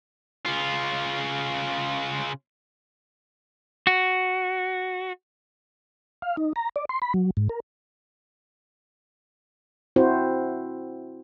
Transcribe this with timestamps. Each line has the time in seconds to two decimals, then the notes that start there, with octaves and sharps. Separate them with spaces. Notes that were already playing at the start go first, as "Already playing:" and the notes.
0.46 C#3 F4
3.87 F#4
6.22 F5
6.37 D#4
6.56 A#5
6.76 D5
6.89 C6
7.02 B5
7.14 F#3
7.37 G#2
7.49 A#4
9.96 C4 E4 F#4 C5